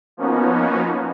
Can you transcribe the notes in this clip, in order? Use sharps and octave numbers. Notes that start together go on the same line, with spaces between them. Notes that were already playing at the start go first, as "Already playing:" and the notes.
F3 A#3 B3 C#4 D#4 F#4